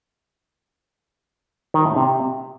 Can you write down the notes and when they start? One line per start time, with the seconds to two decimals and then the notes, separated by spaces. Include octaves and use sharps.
1.74 D#3
1.85 A2
1.96 C3